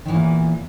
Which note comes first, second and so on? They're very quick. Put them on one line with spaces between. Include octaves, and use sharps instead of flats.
D#3 E3 E2 A#2